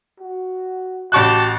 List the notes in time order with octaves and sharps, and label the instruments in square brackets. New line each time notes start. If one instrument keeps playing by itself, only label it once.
[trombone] F#4
[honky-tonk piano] A1 C#6 F#6 [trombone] F#4 [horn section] G4 A5